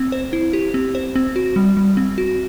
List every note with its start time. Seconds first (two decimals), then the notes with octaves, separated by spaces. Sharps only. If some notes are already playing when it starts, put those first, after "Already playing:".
Already playing: C4
0.12 C5
0.33 E4
0.53 G4
0.74 C4
0.95 C5
1.15 C4
1.36 F#4
1.56 G3
1.77 G3
1.97 C4
2.18 F#4